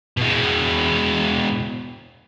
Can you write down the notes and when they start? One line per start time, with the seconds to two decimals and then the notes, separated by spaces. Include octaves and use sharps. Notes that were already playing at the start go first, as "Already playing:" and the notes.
0.17 B2 G#3